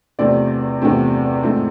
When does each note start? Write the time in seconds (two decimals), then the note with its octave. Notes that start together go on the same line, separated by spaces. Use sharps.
0.19 E2 C3 F3 A3 C4 D5
0.82 E2 C3 F3 A3 C4
1.43 G#2 F3 A3 C4